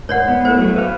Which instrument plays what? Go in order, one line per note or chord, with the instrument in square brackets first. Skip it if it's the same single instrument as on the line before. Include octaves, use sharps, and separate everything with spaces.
[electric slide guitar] G#2 [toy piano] C#5 D5 F#5
[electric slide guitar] B3
[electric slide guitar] A3 E4 [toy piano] C5
[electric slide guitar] F#3 A3
B4 F5